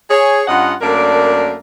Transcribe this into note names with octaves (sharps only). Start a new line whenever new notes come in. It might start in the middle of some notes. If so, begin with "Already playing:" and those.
G#4 C#5
G2 C#4 F4 D#5 F#5
F#2 A3 A#3 D4 A#4 D5